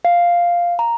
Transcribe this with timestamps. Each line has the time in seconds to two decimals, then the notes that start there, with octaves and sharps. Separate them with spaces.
0.05 F5
0.79 A#5